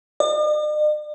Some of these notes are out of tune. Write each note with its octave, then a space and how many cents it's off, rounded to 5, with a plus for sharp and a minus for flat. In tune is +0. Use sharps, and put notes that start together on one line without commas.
D5 +45